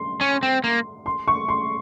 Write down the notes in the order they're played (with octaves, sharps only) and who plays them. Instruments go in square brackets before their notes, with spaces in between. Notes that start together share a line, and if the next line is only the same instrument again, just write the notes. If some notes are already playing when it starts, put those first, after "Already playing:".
Already playing: [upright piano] C6
[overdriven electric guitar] C#4
C4
A#3
[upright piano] C6
C#6
C6